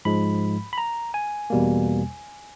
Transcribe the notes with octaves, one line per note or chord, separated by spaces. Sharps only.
G#2 F3 G#3 B5
B5
A#5
G#5
E2 B2 G3 A#3